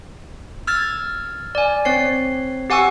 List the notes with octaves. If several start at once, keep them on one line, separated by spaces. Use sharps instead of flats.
E6 F6 G#6 A6
D5 G#5
C4 C#5 C7
G4 F#5 G#5 C#6 E6